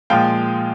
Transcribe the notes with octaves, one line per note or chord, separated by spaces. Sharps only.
A#2 F3 G#3 F5 G5